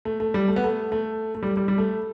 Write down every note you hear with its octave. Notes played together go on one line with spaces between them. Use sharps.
A3
A3
G3
A3
B3
A3
A3
A3
G3
G3
G3
A3